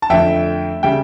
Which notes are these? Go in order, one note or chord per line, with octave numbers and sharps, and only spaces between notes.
A5
F2 D3 A3 E5 G5
C#3 G3 E5 G5